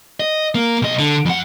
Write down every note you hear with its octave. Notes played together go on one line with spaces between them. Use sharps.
D#5
A#3
B1 D#5
D3
F2 F#5